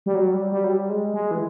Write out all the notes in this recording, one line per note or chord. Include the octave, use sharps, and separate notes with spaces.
G3
F#3
G3
G3
F#3
G3
G#3
G#3
E3